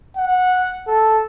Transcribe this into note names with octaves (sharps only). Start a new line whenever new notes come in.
F#5
A4